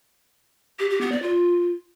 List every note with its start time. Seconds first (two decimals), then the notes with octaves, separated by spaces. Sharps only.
0.79 G4
0.90 G4
1.01 B3
1.12 D5
1.22 F4